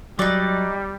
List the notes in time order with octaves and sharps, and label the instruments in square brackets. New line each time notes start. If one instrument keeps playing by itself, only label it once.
[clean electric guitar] F#3 [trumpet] G3 [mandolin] D#4 D5